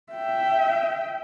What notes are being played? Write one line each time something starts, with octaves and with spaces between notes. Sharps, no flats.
E5 G5